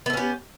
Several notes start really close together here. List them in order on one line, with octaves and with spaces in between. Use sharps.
B3 A4 C#4 G4